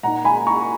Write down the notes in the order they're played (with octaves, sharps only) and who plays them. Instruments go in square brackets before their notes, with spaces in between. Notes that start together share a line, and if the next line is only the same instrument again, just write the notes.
[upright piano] A#2 A#3 D#4 F#5 A#5
G#5 B5
A#5 C#6